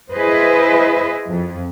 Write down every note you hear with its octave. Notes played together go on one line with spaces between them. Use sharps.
E4 G#4 B4 C5 D#5
F2